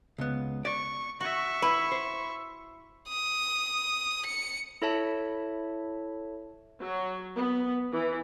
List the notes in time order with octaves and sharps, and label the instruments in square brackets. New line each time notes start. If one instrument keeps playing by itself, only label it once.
[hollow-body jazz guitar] C#2 B3
[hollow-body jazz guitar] D5 [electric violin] C#6
[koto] F#4 [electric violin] E5 C#6
[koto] E4 [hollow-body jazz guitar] B4
[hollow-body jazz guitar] C5
[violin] D#6
C#7
[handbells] E4 A4 C#5 E5 A5
[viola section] F#3
B3
E3